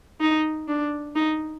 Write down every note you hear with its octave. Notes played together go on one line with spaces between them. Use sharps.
D#4
D4
D#4